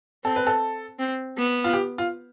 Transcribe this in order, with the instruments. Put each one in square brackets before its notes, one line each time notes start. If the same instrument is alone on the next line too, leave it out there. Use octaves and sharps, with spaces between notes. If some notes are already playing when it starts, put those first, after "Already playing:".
[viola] C4 [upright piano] A4
[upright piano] B4
A4
[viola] C4
B3
[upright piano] F4
G4
F4